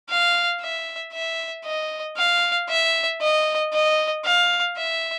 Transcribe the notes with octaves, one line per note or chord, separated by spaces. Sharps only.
F5
E5
E5
D#5
F5
E5
D#5
D#5
F5
E5